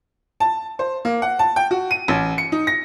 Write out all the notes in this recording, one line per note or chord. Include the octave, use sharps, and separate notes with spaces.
A5
C5
A#3
F#5
A5
G5
F#4
D#7
A1
C#7
D#4
A#6